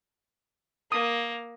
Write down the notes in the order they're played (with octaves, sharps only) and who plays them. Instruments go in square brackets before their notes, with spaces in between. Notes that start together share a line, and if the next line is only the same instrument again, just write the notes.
[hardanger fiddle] A#3 [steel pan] D#6